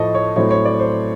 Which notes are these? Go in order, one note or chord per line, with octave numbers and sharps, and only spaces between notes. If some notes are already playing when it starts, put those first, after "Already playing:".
Already playing: A2 F3 A3 D#5 A5 C#6
C#5
A2 F#3 A3 C4 C#5
C#5
D5
C5